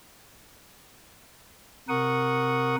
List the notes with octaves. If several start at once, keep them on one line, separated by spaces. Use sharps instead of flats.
C3 A#4 F#5 C#6 D#6